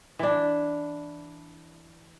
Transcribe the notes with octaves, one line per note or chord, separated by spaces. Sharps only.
E3 D4